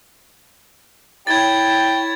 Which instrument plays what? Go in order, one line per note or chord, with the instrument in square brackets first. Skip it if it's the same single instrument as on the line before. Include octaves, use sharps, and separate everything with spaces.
[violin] E4 C#5 [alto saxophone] G5 [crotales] G#6 A6